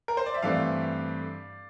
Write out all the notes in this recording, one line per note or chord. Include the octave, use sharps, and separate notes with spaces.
A#4
C5
D5
E5
G2 E3 A3 C4 D5 F5